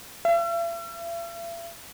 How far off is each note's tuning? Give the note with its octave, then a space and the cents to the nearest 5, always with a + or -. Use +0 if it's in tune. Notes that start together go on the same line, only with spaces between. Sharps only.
E5 +45